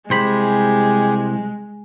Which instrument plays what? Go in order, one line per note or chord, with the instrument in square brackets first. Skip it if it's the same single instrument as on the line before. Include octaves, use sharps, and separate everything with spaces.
[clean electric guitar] C2 C5 B5 [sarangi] G#3 [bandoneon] G4 G#4